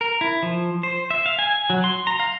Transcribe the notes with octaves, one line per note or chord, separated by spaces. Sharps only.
A#4
E4
F3
C5
E5
F5
G#5
F#3
C6
A#5
F5